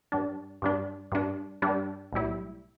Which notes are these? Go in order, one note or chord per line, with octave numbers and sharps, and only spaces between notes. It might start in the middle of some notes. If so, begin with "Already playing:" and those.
G2 G3 D4
G2 G3 D4
G2 G3 D4
G2 G3 D4
B1 A2 G3 E4